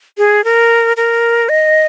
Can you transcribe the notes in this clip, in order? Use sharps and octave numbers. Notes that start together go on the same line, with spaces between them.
G#4
A#4
A#4
D#5